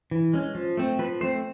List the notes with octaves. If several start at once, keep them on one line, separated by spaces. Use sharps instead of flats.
E3
G#3 C#4
F3
A3 C4
F3 B4
A3 C4 C5